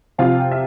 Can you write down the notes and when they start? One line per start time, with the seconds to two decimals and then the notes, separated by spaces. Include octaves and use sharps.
0.18 C3 F3 C4 F4 F5
0.40 G5
0.51 E5